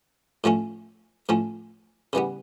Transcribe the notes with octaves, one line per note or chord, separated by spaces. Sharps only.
A2 F3 A3 C#4
A2 F3 A3 C#4
C#3 E3 G3 B3